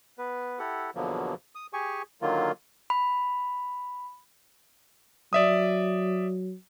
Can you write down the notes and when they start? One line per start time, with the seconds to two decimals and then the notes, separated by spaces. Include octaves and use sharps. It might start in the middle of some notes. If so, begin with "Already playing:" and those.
0.18 B3 B4
0.59 E4 G4 A4 F#5
0.95 E2 B2 D3 F3 F#3 A#3
1.55 D#6
1.73 G4 G#4 G#5 C#6
2.22 D3 D#3 F#3 A#3 F4
2.90 B5
5.33 F#3 D5 E5 D#6